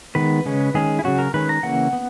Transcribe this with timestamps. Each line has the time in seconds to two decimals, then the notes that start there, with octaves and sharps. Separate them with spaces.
0.15 D#3 G#3 B3 B4
0.46 C#3 G#3 C#4
0.74 D#3 G#3 C#4 G#4
0.99 E4
1.04 C#3 F#3 C#4 F#4
1.18 A#4
1.34 D#3 G#3 C#4 B4
1.49 A#5
1.63 C#3 E3 A#3 C#4 F#5
1.93 B3